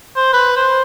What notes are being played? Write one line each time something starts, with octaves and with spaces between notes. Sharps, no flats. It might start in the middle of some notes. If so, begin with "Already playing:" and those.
C5
B4
C5